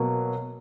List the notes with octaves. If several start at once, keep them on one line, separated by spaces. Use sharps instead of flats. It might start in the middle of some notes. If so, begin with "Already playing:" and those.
Already playing: B2 F#3 A#3